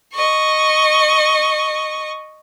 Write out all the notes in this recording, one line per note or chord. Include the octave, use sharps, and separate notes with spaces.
D#5 C#6